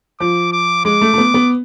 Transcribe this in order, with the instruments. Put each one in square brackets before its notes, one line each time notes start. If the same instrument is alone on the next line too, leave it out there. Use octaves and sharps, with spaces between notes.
[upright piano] F3 [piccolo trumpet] D6
[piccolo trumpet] D6
[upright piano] G#3 [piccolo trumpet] D6
[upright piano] A3
A3
B3
B3